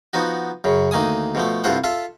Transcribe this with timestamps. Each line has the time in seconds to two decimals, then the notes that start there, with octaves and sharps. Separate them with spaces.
0.13 F3 B3 D#4 F#4
0.64 F#2 C#3
0.91 D2 D#3 A#3 G#5 D#6
1.35 B2 F3 A3
1.64 C2 G2 F4 A4 C5 F#5
1.84 F4 A4 E5